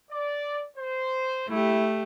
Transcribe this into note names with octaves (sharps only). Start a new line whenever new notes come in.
D5
C5
A3 E4 G4